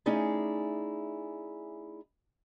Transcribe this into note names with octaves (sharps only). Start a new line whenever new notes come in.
A3 C#4 D#4 E4 G#4 D5